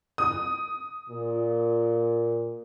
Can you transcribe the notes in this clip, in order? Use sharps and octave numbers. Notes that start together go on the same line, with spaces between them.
D#6
A#2